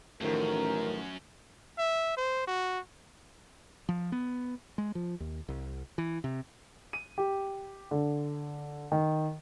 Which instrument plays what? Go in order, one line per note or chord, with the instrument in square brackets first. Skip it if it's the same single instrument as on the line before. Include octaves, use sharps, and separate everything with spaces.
[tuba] A1 [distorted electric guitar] F#2 [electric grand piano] D#3 F3 A3 [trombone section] A#4
[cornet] E5
C5
F#4
[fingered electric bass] F3
B3
G#3
F3
D#2
C2
E3
C3
[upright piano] D#7
G4
D3
D#3